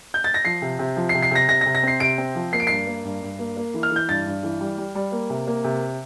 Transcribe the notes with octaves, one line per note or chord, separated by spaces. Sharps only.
G6
A6
A#6
F3 C7
C3
C3
F3
C7
C3
C7
C3 A#6
C3 A#6
A#6
C3
A#6
C4 C7
C3 D7
C4
F3
A#3 C7
D7
G2 C7
A#3
G2
G2
A#3
A#3
E3
F6
E3 G6
G2 A6
G2
E3
G3
G3
G3
A#3
C3
A#3
C3